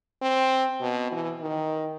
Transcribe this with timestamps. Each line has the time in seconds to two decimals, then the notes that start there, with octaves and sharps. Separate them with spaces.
0.22 C4
0.80 B2
1.12 E3
1.41 D#3